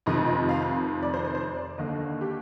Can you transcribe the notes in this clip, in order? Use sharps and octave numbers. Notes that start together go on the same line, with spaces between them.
F1 F2 C3 D#3 D#5
D#5
F5
D5
C5
C5
C5
D5
D#2 D3 D#5
G4